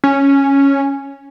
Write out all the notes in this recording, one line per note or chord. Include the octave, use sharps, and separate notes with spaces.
C#4